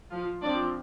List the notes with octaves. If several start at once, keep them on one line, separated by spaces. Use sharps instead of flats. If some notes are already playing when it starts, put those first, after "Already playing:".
F3 F4
F3 C4 D4 D5